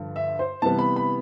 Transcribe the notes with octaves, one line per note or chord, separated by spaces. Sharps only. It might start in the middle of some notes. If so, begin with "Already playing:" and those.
Already playing: G2 D3 F3
E5
C5
C3 E3 G3 B3 A5
B5
B5